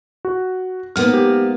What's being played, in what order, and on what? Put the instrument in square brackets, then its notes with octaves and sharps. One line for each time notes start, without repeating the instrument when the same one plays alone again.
[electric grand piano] F#4
[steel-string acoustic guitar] G#2 A#3 B3 [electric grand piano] F6
[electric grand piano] G4